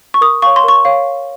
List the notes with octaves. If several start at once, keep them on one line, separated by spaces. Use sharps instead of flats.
C#6
A#4 D#6
C#5 F5 C#6
C6
A#4 C#6
C#5 F5